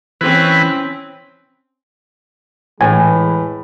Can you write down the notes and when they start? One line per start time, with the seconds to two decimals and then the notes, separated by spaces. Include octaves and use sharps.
0.21 E3 C4 C#4 B4
2.81 A2 E3 G#3 B4 G#5